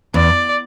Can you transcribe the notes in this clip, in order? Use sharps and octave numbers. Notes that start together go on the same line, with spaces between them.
E2 D5